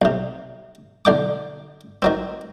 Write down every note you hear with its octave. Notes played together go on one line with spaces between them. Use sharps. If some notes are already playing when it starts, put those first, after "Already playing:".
B1 C3
B1 D3 G5 D6
D#3 F#3 C4